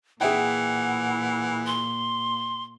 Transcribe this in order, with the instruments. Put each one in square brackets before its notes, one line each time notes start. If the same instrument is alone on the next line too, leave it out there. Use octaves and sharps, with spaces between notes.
[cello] A#2 [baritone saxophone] E3 [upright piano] G#4 E5 G5 [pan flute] F#5
[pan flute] C6